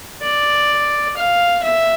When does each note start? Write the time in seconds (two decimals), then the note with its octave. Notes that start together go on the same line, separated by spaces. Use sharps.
0.23 D5
1.17 F5
1.63 E5